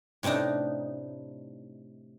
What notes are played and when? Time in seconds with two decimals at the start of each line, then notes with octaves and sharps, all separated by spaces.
0.23 A2 C3 C4 D4 D#4